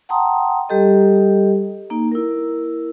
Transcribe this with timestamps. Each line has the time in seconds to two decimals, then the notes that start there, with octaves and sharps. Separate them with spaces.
0.09 F#5 G5 A5 A#5 C6 D#6
0.69 G3 G4 A4 D#5
1.90 A#3 D#4
2.12 E4 A#4